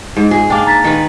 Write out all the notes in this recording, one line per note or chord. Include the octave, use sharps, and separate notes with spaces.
G#2
F4 G#4
A#3 D4 G5 D6
A#5 A6 B6
D#3 B4